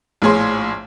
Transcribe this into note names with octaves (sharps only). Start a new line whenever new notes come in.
A#1 A2 G#4 C#5 C6